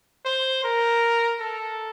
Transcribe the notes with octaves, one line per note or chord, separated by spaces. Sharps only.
C5
A#4
A4